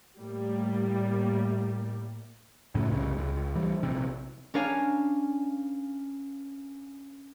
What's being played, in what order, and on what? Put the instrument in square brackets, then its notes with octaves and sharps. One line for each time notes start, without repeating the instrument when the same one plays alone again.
[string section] A2 G3 A#3
[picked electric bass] F#2 A2 C#3
C2 C#3
C#2
E3 G3
A#1 C3
[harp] C#4 D4 A#4 C#5 F5 G#5